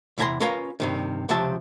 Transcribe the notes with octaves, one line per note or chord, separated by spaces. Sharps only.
E2 C3 E4 G#5 A#5 C6
C#4 F4 A#4 B4 F5 A#5
G2 C3 D#3
C#2 C3 F3 G4 E5 A5